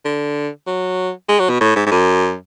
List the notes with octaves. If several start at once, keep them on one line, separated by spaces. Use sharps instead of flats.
D3
F#3
G#3
F#3
B2
A2
G#2
G#2
F#2